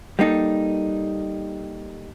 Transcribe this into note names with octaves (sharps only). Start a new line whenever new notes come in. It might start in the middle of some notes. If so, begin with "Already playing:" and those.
G3 A#3 D#4 A4